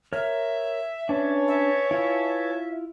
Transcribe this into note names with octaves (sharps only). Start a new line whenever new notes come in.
A#4 C#5 E5 F6
C#4 D4 B4 C#5 G#5 A5
E5
E4 F4